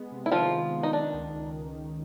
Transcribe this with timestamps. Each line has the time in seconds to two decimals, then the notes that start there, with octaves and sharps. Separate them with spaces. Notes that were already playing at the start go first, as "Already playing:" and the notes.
Already playing: G#3 B3
0.11 C3
0.26 E4
0.31 D#3 F3 F4
0.53 G#3
0.73 B3
0.83 D#4
0.93 D#3 D4
1.14 C#2
1.35 C#2